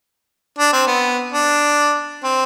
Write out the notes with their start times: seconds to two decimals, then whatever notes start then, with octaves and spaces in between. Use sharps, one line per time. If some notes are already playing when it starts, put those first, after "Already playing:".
0.59 D4
0.73 C4
0.87 B3
1.32 D4
2.24 C4